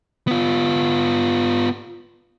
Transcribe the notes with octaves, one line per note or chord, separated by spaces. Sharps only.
B3 F4